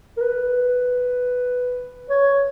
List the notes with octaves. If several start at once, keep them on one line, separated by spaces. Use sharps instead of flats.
A#4
B4
C#5